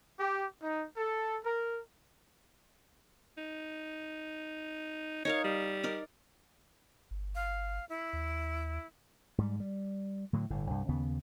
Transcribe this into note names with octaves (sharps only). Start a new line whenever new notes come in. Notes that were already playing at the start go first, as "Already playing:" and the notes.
G4
D#4
A4
A#4
D#4
D#4 A#4 C#5 F5
G3
D#4 A#4 D5
G1
F5
E4
D#2
G#2 G3
G3
A2 D3 F#3
G1 A2 D3
C2 G2
D#2 C#3 B3